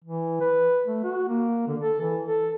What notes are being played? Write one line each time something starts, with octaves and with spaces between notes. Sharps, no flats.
E3
B4
A3
F#4
A#3
D3
A4
E3
A4